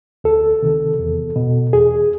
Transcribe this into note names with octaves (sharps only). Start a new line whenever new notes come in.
D2 A4
C3 D#3
E2
B2
E2 G#4